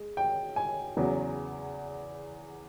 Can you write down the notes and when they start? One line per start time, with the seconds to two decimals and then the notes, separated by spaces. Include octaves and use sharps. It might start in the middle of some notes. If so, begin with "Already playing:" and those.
Already playing: G#3
0.17 G5
0.56 G#5
0.97 E2 C#3 F#3 B3